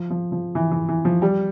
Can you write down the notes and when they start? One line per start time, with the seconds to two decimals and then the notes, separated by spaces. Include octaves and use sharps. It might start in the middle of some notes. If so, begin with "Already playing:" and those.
Already playing: F3
0.10 F3
0.32 F3
0.55 E3
0.71 E3
0.88 E3
1.05 F3
1.22 G3